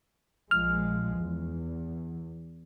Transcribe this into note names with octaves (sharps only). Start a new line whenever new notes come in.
A#1 F3 G#3 F6
E2